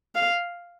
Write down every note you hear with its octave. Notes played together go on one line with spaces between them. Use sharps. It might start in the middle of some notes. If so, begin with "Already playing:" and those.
F5